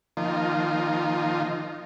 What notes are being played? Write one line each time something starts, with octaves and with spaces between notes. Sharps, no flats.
D#3 F3 A#3 D#4 F4